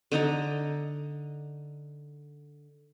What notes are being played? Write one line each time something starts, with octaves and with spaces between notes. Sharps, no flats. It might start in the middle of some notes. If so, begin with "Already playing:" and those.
D3 D#4 D#5 A#5